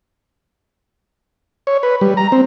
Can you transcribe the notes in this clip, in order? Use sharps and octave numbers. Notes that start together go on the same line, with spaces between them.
C#5
B4
G3
A#5
C4